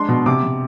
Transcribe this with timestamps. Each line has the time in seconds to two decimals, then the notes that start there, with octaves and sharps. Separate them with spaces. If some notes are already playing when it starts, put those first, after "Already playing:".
Already playing: G#3 D4 C6
0.08 B2
0.26 C3 D6
0.43 C3